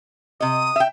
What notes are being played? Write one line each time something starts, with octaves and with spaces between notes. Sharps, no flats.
C3 D#5 D#6
E5 G5